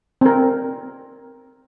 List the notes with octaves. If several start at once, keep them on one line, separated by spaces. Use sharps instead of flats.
C4 A#4